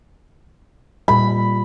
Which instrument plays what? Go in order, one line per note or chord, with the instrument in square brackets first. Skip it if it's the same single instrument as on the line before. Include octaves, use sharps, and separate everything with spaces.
[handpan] A#2 G3 [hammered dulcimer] B5